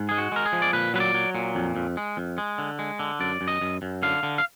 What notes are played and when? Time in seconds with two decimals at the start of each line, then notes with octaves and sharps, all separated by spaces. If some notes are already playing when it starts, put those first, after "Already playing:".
Already playing: G#2
0.09 G#3 G#4
0.18 F#4
0.32 G#3 A#4
0.46 G#4
0.52 F3
0.62 D5
0.73 A#2 B4
0.94 F#3 B4
1.00 D5
1.14 F#3
1.35 A#2
1.55 F2
1.76 F2
1.97 G#3
2.17 F2
2.38 G#3
2.58 D3
2.79 G#3
2.99 D3
3.20 F#2 D5
3.41 F#2
3.48 D#5
3.61 F#2
3.82 F#2
4.03 D3 F5
4.23 D3
4.38 F5